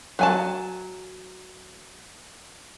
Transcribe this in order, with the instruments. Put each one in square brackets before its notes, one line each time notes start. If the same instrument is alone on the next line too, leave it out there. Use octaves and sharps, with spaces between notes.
[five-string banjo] F#3 G#5 A5